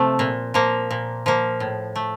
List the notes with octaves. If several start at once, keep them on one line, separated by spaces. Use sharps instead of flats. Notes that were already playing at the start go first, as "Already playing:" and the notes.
Already playing: C3 F3 A3
A#2
F3 A#3
A#2
F3 A#3
A2
A3